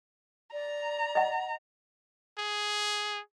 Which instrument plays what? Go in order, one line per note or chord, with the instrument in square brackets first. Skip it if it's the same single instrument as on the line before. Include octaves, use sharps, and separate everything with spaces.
[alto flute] D5 [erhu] A#5
[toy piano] D#5 F#5
[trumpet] G#4